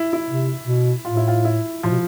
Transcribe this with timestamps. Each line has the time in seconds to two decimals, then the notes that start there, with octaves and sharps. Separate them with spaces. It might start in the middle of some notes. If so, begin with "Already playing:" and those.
Already playing: E4
0.13 E4
0.27 C3
0.67 B2
1.05 A2 F4
1.17 E4
1.28 F4
1.45 E4
1.83 A2 F3
1.90 B2